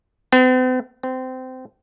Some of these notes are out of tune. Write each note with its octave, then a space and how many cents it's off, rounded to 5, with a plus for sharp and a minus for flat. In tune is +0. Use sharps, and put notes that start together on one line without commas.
C4 -45
C4 -20